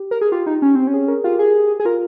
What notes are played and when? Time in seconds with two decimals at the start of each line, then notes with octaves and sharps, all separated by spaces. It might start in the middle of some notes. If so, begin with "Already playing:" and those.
Already playing: G4
0.11 A#4
0.21 G#4
0.32 F4 G4
0.46 D#4
0.62 C#4
0.75 C4
0.87 C#4
0.94 G#4
1.08 A#4
1.24 F4 G4
1.39 G#4
1.80 G#4
1.85 F4 A#4